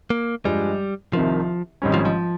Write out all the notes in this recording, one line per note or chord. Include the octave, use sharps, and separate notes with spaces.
A#3
G2 F3 G3 G#3
C2 C3 D#3 F3
G#1 G#2 G3 C#4
F3
F3